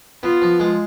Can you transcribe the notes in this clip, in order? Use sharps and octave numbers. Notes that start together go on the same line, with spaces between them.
B3 F4
F3
G#3